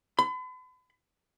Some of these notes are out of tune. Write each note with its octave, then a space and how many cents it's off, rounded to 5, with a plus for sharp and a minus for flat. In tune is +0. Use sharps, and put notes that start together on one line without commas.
B5 +40